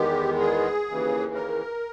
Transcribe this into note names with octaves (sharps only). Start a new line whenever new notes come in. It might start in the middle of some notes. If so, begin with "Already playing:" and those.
Already playing: E2 D#3 G#3 B3 G4
G#4
D#2 C#3 E3
A#4